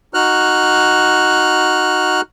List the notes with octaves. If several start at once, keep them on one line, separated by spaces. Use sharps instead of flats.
D#4 F#4 F6 F#6